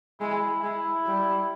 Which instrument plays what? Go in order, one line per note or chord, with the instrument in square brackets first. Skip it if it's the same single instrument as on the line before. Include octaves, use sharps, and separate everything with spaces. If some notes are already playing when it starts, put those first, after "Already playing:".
[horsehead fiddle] G#3 [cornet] E4
[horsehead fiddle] G#3 [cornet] E4
[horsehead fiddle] G3